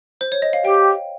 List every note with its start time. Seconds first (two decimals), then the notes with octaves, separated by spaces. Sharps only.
0.21 C5
0.32 C#5
0.42 D#5
0.53 F5
0.64 G4 G5